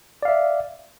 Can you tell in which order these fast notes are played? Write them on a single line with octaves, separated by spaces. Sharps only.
D5 F5 E5